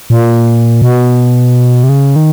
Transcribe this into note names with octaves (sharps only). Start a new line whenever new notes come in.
A#2
B2
C3
C#3
D#3